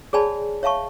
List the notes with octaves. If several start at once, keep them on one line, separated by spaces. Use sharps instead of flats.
G#4 C#5 D5 G#5 A5 B5
C#5 E5 F5 A5 C#6